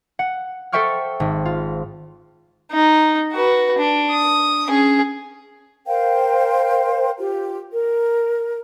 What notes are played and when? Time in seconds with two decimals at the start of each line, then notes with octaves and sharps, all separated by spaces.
0.19 F#5
0.72 A4 C5 E5 G5 C#6 F6
1.20 G#1
1.45 F4
2.72 D#4
3.33 F#4 B4
3.78 D4
4.11 D#6
4.66 C#4 G#4
5.86 A#4 C5 F5 G5
7.17 F4 G4
7.71 A#4